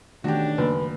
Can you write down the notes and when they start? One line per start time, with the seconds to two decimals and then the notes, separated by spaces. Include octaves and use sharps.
0.24 B2 D#3 E3 A3 C#4 D4 F#4 G4
0.58 F#2 C#3 A#3 B4